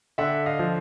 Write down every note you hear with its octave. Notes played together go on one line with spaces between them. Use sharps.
D3 E5 F#5
D#5 F5
F3